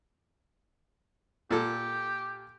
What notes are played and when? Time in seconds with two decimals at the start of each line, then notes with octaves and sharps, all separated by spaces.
1.51 A#2 G4 A4